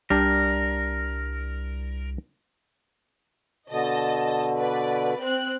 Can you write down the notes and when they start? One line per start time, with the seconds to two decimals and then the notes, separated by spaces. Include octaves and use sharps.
0.10 C2 G3 D4 A#4
3.70 B2 D3 D#5 A5
4.58 B4 D5
5.21 C4 F#6